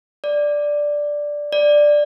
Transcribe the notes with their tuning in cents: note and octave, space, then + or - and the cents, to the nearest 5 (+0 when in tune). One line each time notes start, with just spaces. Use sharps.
D5 +0
D5 +5